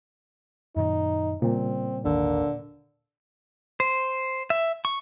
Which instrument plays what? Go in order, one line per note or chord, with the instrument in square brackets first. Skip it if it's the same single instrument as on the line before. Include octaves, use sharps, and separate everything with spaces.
[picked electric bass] F#2 A#2 D#3 [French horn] D#4
[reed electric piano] A#2 [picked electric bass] C#3 G3 [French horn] C4
[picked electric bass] G#1 D#2 D#3 [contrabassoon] D3 [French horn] A#3
[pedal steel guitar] C5
E5
C#6